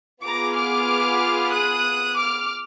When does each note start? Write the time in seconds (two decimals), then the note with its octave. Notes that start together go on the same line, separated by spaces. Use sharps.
0.22 B3 F4 G#4 A#5 D6
0.54 D6 F6
1.51 D#6 F#6
2.15 D6 F6